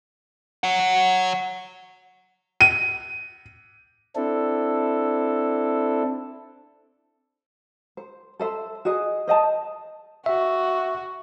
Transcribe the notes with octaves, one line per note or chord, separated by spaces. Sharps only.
C#5 F#5
D#7
C4 D4 E4 A4
C5
A4 C5 E5
F#4 G#4 D#5
C5 D#5 F#5 A5
F#4 E5